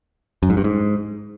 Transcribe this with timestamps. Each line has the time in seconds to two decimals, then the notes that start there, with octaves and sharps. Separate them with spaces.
0.43 F#2
0.50 G#2
0.57 G2
0.64 G#2